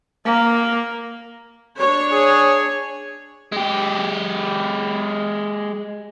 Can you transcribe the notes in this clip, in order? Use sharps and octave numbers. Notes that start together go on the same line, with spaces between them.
A#3
D4 C#5
G#4
G#3 G4